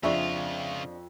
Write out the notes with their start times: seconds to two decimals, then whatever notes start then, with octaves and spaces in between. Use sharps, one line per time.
0.03 F2 C#3 C4 D4 F4 G#4 E5 C#6